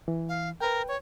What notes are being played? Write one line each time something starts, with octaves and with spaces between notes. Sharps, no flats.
E3
F5
A#4 B4 G5
C#5